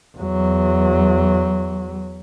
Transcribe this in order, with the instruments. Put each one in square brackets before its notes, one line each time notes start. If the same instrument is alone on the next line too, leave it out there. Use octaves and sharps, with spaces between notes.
[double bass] E2 F#3